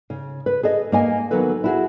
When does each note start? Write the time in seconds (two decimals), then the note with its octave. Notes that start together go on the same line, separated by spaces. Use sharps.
0.10 C#3
0.46 B4
0.63 G#4 A4 D#5
0.92 A#3 D#5 G#5
1.31 D#3 F#3 B3 A4 B4
1.64 E4 F#4 G#4